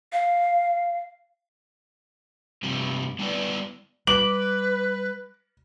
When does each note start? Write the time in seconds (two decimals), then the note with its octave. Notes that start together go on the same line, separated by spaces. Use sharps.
0.12 F5
2.63 G2 C3 F3 G3
3.19 G3 B3 E4 F#4 B4 D5
4.07 G3 B4 D6 F#7